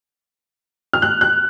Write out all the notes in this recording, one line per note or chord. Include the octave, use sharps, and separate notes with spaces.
F6
F#6
F#6